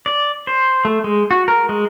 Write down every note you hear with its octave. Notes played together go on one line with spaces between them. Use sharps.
D5
C5
A3
G#3
F#4
A#4
G#3